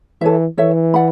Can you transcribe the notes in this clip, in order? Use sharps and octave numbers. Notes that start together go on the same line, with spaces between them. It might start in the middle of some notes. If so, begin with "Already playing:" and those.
E3 A4 C#5 E5
E3 A4 C#5 E5
D5 F#5 B5